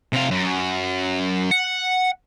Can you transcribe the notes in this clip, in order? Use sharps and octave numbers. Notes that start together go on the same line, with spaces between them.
C3 F5
F#2
F#5